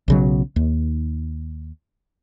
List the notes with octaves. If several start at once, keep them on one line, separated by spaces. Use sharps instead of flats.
B1 C#3 F#3
D#2